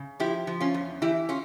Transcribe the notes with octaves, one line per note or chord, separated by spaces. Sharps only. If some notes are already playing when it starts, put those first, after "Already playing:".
Already playing: C#3
F3 E4 G4
F3
C#4 F4
E2
E3 E4 G4
C#4 F4